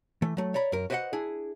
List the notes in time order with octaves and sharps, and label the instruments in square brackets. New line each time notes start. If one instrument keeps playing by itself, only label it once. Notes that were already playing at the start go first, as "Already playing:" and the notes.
[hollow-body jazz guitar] E3 A3
F#3 A3
C#5 D5 A#5 B5
F#2 A#4
F#4 B4 C5 D5 D#5 F#5
D4 E4 G#4